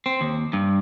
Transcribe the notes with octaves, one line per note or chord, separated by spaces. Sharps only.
C4
D#2
G2